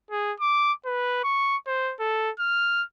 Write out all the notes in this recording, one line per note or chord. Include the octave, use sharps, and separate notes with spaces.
G#4
D6
B4
C#6
C5
A4
F6